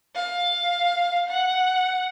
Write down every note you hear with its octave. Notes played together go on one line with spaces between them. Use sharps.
F5
F#5